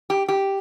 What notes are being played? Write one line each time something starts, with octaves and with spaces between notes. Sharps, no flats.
G4
G4